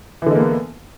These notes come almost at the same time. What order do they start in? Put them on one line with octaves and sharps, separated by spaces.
E3 D3 G#3 A#3 B3